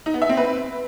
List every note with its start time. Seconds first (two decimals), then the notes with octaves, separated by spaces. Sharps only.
0.06 D#4
0.14 B3
0.22 E5
0.29 C4
0.37 B4